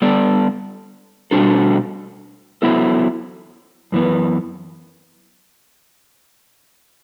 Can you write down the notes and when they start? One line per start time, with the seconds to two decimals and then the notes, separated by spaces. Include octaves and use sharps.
0.02 G3 B3 D4 A4 D5
1.31 B2 G3 D4 F#4 A4
2.62 F#3 B3 E4 A4 E5
3.92 F#2 E3 B3